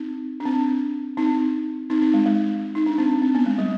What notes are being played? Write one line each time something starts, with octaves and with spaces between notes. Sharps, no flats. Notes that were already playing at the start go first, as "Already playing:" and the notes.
Already playing: C4 D#4
D4
C4
C4 D#4
C4 D#4
C4 D#4
G#3
G#3
D#4
D4
C4
C4
B3
G#3
G3